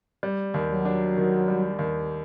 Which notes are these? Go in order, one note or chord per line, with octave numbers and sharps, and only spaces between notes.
G3
D#2
F#3
D4
D#3
G3
D#2